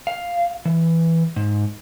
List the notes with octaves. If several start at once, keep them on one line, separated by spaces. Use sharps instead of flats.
F5
E3
G#2